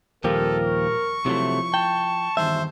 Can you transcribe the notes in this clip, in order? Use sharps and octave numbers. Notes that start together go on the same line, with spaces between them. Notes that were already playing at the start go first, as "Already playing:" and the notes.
D#2 A#2 F3 G3 F4 G4 A4 A#4
C#6
C3 F3 F#3 A3 E4
G5 A5
E2 G2 D#3 C5 E5